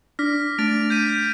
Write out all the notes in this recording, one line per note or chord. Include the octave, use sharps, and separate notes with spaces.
D4 F6 A#6 B6
A3 D4 A6 D7 F7
G6 B6 D#7